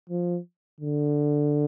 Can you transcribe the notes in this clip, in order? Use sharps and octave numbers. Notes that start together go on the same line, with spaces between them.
F3
D3